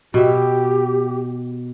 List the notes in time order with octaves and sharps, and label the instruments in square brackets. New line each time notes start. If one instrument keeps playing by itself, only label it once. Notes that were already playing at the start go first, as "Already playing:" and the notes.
[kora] B2 E5 [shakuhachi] G4